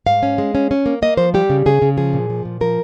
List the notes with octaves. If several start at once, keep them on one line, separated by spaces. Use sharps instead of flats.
G#2 F5
C#4
G#3
C#4
C#4
A#3
A#3 D#5
F3 C5
G3 G4
C#3
C#3 G#4
C#3
F3 G#4
A#2
F3
A#2
F3 A#4